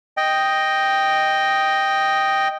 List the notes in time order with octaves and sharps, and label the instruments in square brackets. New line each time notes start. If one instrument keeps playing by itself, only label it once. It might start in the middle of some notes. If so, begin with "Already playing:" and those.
[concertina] D#5 G5